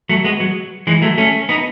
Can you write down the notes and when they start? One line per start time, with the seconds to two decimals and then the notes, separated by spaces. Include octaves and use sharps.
0.09 F#3 A3
0.24 G#3 B3
0.40 F#3
0.87 E3 G#3
1.02 F#3 A3
1.18 A3 C#4
1.49 B3 D#4